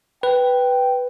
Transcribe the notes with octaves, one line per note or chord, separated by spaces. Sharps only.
B4 G5